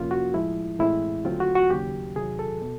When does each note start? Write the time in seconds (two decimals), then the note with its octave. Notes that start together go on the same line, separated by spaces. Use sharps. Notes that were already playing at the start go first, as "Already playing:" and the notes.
Already playing: F2 C3 F3 A#3 C#4 F4
0.11 F#4
0.34 A2 F3 G#3 E4
0.79 A2 E3 G#3 C4 E4
1.24 D#2 D3 F#3 A3 C4 F4
1.40 F#4
1.56 F#4
1.70 D#2 C#3 F#3 G4
2.16 E2 C3 D#3 F#3 G#4
2.39 A4
2.62 B2